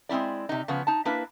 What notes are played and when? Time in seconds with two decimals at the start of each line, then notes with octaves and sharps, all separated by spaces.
0.09 G#3 C4 C#4 E4 D5
0.49 C3 D#4
0.68 C#3 F3 B3
0.87 D#4 A5
1.05 A#3 D4 E4 B4